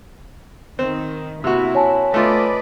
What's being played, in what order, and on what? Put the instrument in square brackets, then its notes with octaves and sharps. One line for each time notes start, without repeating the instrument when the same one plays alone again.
[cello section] D#3 [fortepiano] C4
[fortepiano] C3 F#4 [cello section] A#3 E4
[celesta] C#5 G#5 A5
[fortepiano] A3 F4 [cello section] B4 D5 D#5